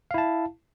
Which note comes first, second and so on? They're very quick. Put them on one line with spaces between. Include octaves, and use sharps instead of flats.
F5 E4 A5